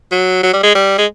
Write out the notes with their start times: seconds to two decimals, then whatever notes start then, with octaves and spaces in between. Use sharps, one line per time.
0.12 F#3
0.43 F#3
0.53 G3
0.64 G#3
0.75 G3
0.98 G#3